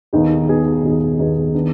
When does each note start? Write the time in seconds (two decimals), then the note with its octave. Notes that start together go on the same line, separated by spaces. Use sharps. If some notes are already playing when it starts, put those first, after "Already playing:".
0.13 D#2 D#3 B3 D#4 G#4
0.48 D#2 D#3 B3 D#4 G#4
0.83 D#2 D#3 B3 D#4 G#4
1.19 D#2 D#3 B3 D#4 G#4
1.54 D#3 B3 D4